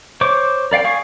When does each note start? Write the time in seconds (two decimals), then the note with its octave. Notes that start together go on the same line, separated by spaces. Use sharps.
0.21 C5 C#5 D6
0.72 A#4 D5 F5 G5
0.84 G#4 F5 C#6